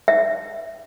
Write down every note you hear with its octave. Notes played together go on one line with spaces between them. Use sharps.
E5